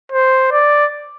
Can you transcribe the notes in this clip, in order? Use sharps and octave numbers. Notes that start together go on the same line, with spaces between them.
C5
D5